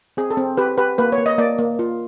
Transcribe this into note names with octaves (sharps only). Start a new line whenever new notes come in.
C4 G#4
A4
C4
G4 B4
G4 B4
A#3 B4
C#5
A#3
D#5
A#3 D5
A#3
F4